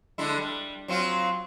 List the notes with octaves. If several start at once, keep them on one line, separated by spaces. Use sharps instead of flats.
D3 G#3 E4
G3
F#3 C4 F4